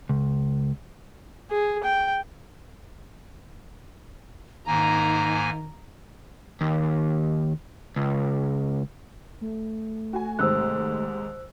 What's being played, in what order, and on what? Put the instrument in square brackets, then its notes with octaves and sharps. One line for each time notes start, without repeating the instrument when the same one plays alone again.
[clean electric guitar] C#2
[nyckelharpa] G#4
G5
[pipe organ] G#2 A#3 G#5 [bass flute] D#3 [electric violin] A#5
[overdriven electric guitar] D#2
C#2
[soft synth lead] A3
[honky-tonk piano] F#4 G#5
[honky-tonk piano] D#2 G#2 C3 [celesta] C5 E6 F#6